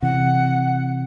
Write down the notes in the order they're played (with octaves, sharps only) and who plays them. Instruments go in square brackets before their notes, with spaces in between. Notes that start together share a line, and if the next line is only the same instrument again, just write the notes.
[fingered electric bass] C3 E3 [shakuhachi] F#5